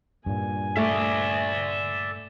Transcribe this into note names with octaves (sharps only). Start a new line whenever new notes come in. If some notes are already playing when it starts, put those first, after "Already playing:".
G2 A#2 G#5
A3 D5 E5